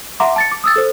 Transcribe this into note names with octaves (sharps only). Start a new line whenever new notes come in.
E5 F#5 A#5 C6 D6
A5 A6 C#7
D6
D#6 E6 A6
A4 C5